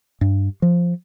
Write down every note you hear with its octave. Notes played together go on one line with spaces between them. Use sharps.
G2
F3